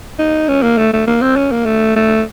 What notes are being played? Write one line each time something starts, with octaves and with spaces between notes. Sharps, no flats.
D#4
C#4
A#3
A3
A3
A#3
C4
C#4
A#3
A3
A3